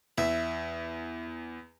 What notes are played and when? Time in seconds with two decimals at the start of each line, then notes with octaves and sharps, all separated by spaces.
0.18 E2 E5